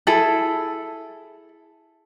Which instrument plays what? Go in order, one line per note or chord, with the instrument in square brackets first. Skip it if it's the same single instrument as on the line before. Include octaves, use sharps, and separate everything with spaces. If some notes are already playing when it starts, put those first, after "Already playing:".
[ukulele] E4 G#4 A4